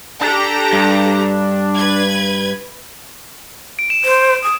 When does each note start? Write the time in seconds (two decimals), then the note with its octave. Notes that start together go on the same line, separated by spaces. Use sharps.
0.21 D4 G4 A4 A#5
0.73 G2
1.77 B4 G#6
3.79 D7
3.90 E7
4.04 C5
4.43 D#6